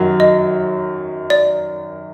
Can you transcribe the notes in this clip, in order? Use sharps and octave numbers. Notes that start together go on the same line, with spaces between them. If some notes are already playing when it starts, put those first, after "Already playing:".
Already playing: F#2 D#3 F#3
D#5
D5